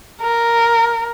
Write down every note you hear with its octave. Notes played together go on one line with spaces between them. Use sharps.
A#4